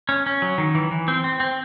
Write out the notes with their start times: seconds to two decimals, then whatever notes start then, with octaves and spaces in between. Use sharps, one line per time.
0.09 C#4
0.26 C#4
0.42 F#3
0.58 D#3
0.75 E3
0.91 E3
1.08 C4
1.24 C4
1.40 C4